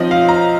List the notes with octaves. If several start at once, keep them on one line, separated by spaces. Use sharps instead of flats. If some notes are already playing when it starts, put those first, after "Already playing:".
Already playing: F3 C4 D#4 D#5
F5
A#5